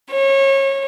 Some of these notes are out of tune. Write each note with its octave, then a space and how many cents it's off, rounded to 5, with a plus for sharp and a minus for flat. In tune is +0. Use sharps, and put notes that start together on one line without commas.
C#5 -30